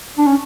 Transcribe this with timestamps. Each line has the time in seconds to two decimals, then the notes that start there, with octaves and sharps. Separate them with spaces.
0.18 D4
0.26 C#4